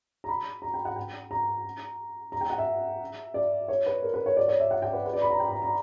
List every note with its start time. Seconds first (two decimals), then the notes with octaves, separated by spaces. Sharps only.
0.24 A#5
0.29 B5
0.62 A#5
0.74 G5
0.85 F#5
0.96 G5
1.31 A#5
2.32 A#5
2.41 G5
2.50 F#5
2.58 E5
3.34 D5
3.68 C#5
3.86 B4
4.02 A#4
4.14 B4
4.26 C#5
4.37 D5
4.48 C#5
4.60 E5
4.71 F#5
4.82 G5
4.93 B4
5.06 B4
5.13 D5
5.22 B5
5.31 A#5
5.40 G5
5.51 A#5
5.62 A#5